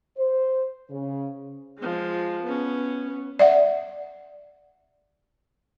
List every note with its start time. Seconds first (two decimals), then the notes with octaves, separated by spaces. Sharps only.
0.17 C5
0.90 C#3
1.79 F3 G#3
2.43 B3 C#4
3.39 D5 E5 F#5